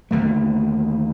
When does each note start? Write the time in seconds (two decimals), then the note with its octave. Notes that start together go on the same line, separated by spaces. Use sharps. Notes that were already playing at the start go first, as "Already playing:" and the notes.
0.11 D#2 D3 A3